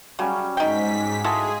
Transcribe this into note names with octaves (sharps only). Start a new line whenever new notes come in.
C#3 F#3 G3 C#4
G#2 D#4 G5 B6
G#3 E4 F#4 G#4 A4 D#5 F5